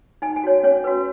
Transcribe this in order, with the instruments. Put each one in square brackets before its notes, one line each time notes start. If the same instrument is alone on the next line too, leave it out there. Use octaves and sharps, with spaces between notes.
[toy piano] D#4 G#5
G#5
F#4 C#5
C#4 C#5
F#4 B4